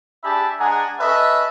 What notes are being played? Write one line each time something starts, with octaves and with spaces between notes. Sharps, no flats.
D4 G4 G#4 E5 A5 B5
G#3 D4 G#4 F#5 G#5 A#5
C#4 A4 B4 D#5 E5